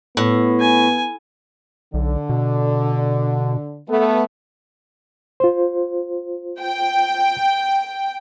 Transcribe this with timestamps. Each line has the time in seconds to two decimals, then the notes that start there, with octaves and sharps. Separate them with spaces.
0.17 A2 B3
0.59 G#5
1.94 B1 D3
2.29 B2
3.89 A3 B3 A4
5.40 F4 C5
6.62 G5